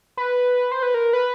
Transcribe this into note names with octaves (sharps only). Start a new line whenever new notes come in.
B4
C5
B4
A#4
B4